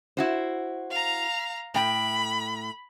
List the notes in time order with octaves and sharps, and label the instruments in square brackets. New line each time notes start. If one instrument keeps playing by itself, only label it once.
[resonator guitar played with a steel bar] E4 F#4 C5
[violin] F5 A#5
[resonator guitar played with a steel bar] A2 G5 [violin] B5